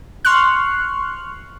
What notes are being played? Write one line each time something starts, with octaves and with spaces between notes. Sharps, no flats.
C6 C#6 F6 F#6